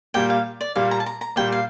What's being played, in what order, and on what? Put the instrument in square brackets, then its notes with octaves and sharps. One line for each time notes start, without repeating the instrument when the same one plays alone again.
[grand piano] A#2 G3 A#3 [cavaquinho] G5
[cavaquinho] F5
D5
[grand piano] A#2 G3 A#3 [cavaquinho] F5
[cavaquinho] A#5
A5
A#5
A#5
[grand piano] A#2 G3 A#3 [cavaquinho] G5
[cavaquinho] F5